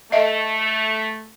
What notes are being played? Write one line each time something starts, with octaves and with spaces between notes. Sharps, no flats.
A3 D#5 E5